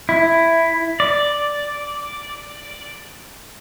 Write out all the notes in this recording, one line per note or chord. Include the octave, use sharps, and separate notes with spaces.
E4
D5